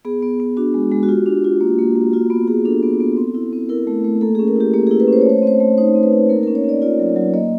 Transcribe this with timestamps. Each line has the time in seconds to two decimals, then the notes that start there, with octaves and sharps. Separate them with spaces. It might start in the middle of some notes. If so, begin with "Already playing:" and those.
0.05 B3 G#4
0.22 B3
0.40 B3
0.57 D4 F#4
0.74 G#3
0.92 G#3
1.03 F#4
1.08 F4 G4
1.26 D4
1.44 F4
1.61 A#3
1.79 A#3
1.96 A#3
2.13 F4 F#4
2.30 B3
2.47 B3 G#4
2.65 D4 A4
2.83 B3
3.00 B3
3.17 C4
3.34 E4
3.53 C4
3.69 E4 A#4
3.87 A3
4.04 A3
4.21 A#3 A4
4.35 C#4 G#4
4.48 A#4
4.56 E4 G4
4.74 A#3 G4
4.87 E4 G#4
5.00 B4
5.08 C#4 C5
5.21 C#5
5.26 A3 C5
5.38 C#5
5.42 C4 C5
5.60 A3
5.78 D#4 C5
5.95 C4
6.03 B4
6.13 D#4
6.29 A#3 A#4
6.43 C#4 A#4
6.55 C#5
6.64 C#4 D5
6.82 F4 D5
6.99 F#3
7.16 F#3
7.34 A#3 D#5